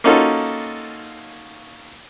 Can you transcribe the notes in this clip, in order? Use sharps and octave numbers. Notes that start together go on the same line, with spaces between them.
A#3 C#4 D#4 F4 F#4 A4